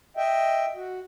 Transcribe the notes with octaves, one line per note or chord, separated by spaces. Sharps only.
D#5 E5 G5
F#4